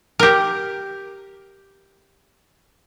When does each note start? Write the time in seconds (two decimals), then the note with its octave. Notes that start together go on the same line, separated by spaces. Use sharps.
0.19 G4 A#4